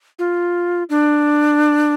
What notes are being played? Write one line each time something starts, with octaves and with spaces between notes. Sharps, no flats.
F4
D4